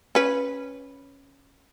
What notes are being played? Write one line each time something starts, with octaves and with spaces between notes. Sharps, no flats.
C#4 B4